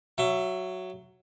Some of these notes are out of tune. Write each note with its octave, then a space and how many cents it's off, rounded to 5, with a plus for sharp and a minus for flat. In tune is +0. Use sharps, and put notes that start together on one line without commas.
F#3 +0 E5 +20